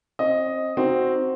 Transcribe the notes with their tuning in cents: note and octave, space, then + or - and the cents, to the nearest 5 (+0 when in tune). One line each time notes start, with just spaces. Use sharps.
C4 +25 D#5 +5
C4 +0 D#4 +0 F#4 +5